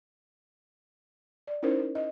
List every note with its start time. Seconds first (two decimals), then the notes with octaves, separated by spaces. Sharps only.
1.47 D5
1.63 C#4 D#4 E4 A#4 C5
1.95 D#5